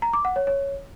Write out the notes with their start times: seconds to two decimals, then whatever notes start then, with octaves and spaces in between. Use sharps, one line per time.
0.02 A#5
0.13 D6
0.25 F#5
0.36 C#5
0.47 C#5